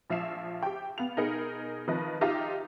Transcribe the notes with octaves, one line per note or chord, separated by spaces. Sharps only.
A#1 F3 E5 F5 C7 E7
G4 G5
B3 F5 F7
B2 D#4 G#4 A#4 B5 C#7
D#3 F3 C4 B4 D#5
D#4 F4 G4 D#5 E5 A#5